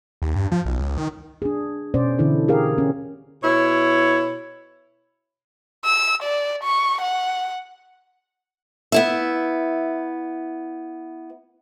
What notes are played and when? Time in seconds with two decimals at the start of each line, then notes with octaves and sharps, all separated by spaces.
0.22 D#2
0.36 G2
0.52 F3
0.65 B1
0.79 C#2
0.98 D#3
1.42 D4 G#4
1.94 B2 C#4 C5 D5
2.19 D3 E3 D4 E4 A4
2.48 G4 G#4 A#4 F5
2.78 C#4
3.44 B2 E4 C#5
5.85 E6
6.23 D5
6.64 C#6
7.01 F#5
8.92 B3 E4 E5